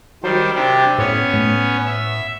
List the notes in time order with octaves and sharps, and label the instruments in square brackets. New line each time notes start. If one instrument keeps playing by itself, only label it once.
[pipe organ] D#3 G3 C5 [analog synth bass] F#3
[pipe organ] C3 D4 G4
[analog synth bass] A2 [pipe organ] B3 C#4 C#5
[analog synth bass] A2
[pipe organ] E5